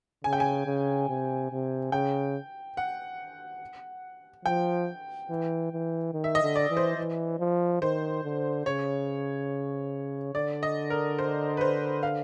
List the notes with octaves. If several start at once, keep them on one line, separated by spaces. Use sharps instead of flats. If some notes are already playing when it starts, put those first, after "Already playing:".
C#3 G#5
G5
G#5
C#3
C3
C3
C#3 G5
F#5
F3 G5
E3
E3
D#3
E5
D#5
D3
D5
E3
C5
E3
F3
D#3 C5
D3
C#3 C#5
D3 D5
D#5
A#4
C5
B4
C5
F5